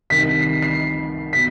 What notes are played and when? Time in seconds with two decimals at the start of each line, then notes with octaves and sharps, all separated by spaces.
0.10 C2 C3 D#3 B6
0.41 C7
0.62 C7
1.33 B2 B6